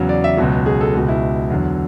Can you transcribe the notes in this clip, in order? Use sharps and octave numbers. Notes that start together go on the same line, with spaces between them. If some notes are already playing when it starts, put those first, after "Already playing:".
Already playing: E2 C#3 F#3
D5
E5
C#2 B2 F#3 F#4
G#4
A4
C#2 B2 G#3 F#4
E4
E2 D3 F#3